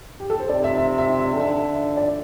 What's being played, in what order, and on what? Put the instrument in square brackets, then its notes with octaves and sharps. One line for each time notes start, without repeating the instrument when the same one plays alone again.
[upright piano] G4
A4
C5
[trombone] C3 [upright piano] D5
[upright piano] E5
E5
E5
E5
[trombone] D3
[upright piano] E5
E5
D5